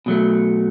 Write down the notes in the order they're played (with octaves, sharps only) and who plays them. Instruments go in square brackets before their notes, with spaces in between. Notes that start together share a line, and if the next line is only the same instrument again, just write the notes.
[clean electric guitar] B2 F#3 A3